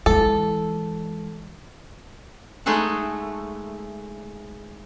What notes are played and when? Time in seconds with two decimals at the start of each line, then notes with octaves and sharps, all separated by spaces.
0.06 E3 G#3 A4
2.66 G#3 A3 D#4 G#4 A4 F#5